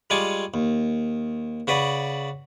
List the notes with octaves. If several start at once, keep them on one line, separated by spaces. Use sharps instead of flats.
G3 G#3 F4 G#5 C#6 D6
D#2
C#3 F#4 B4 D5